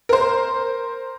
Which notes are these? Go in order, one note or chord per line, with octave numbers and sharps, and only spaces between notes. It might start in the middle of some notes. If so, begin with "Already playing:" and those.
A#4 C5